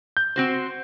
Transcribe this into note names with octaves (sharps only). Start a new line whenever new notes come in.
G6
C4 F#4 C5